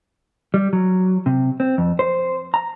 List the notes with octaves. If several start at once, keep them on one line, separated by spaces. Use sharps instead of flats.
G3
F#3
C3
C4
F2
C5
A#5